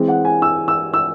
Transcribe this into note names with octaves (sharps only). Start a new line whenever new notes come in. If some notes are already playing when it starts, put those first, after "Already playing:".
Already playing: E3 G#3 C4
F#5
G#5
E6
E6
E6